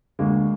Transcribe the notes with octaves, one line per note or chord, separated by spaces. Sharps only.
D2 G#3 A#3